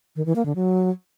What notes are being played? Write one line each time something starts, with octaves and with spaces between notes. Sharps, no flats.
D#3
E3
A#3
D3
F#3